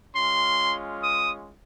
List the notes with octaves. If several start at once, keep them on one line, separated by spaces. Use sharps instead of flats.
G#3 C#4 F4 C6
D#6